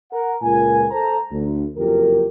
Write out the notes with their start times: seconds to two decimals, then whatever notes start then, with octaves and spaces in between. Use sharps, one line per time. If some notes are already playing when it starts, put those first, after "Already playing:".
0.12 A#4 F#5
0.42 C#2 A#2 A#4 G#5
0.91 A4 C5 A5 A#5
1.31 D2
1.77 F#1 F2 G4 A#4